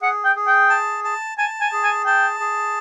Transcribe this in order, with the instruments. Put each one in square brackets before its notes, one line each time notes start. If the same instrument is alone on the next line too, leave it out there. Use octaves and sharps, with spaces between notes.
[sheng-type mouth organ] G#4 [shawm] F#5
[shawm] G5
[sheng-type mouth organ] G#4
[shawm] G5
[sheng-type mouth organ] A5
A5
[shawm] G#5 [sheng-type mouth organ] A5
[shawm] G#5
[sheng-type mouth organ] G#4
[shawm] G#5
[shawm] G5 [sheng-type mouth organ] A5
[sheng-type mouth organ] G#4